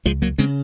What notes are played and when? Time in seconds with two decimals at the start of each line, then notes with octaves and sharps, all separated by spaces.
0.05 C#2 F3 G#3
0.22 F#3 A#3
0.38 C#3 G#3 C4